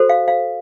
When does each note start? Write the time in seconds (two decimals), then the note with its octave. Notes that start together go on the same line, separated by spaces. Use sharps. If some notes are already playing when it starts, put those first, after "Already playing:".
Already playing: F#4 A4 C5
0.09 F5
0.28 F5